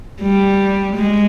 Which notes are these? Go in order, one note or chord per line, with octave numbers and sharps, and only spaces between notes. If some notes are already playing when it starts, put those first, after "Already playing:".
G3
G#3